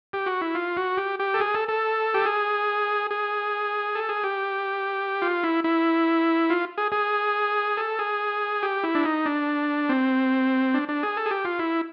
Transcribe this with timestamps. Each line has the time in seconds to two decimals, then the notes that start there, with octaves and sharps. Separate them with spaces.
0.13 G4
0.26 F#4
0.41 E4
0.55 F4
0.77 F#4
0.97 G4
1.20 G4
1.34 A4
1.40 G#4
1.55 A4
1.68 A4
2.14 G4
2.26 G#4
3.11 G#4
3.95 A4
4.09 G#4
4.24 G4
5.22 F4
5.44 E4
5.64 E4
6.50 F4
6.78 G#4
6.92 G#4
7.77 A4
7.99 G#4
8.63 G4
8.84 E4
8.95 D4
9.05 D#4
9.26 D4
9.89 C4
10.74 D4
10.89 D4
11.03 G#4
11.17 A4
11.26 G#4
11.31 G4
11.45 F4
11.59 E4